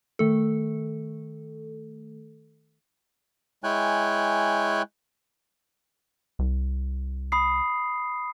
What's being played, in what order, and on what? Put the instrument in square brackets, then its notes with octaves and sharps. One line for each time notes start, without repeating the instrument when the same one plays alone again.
[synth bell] D#3 A3 A4
[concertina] G#3 E4 C#5 G5 G#5 F#6
[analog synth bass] C2
[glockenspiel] B5 D#6 C7